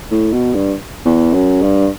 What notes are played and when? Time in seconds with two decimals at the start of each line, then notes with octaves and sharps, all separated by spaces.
0.11 A2
0.32 B2
0.54 G2
1.05 E2
1.34 F#2
1.62 G2